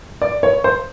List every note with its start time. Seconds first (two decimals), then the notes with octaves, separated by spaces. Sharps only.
0.22 D5
0.43 C#5
0.64 C5